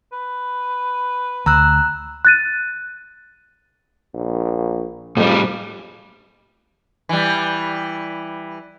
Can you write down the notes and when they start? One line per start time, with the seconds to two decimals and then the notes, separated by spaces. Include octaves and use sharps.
0.13 B4
1.46 D2 A#5 E6 F#6
2.25 F#6 A6 D#7
4.14 A#1
5.17 F2 A2 G3
7.09 E3 G3